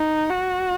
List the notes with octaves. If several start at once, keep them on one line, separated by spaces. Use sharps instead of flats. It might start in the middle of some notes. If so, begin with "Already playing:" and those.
Already playing: D#4
F#4